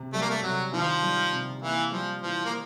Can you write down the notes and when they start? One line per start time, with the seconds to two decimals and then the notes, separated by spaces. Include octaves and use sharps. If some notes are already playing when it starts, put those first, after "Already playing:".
Already playing: C3
0.13 G3 A3
0.22 A#3
0.30 A3
0.42 C3 F#3
0.72 D#3 F3
1.02 G3
1.32 C3
1.61 E3 A#3
1.91 F3 G3
2.22 E3 F3
2.45 A#3